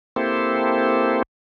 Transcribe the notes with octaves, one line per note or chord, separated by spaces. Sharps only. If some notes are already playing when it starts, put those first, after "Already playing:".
A#3 C4 E4 G4 A4 C5